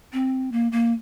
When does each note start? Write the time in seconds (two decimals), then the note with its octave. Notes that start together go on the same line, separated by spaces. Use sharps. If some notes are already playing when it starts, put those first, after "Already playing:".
0.13 C4
0.52 A#3
0.72 A#3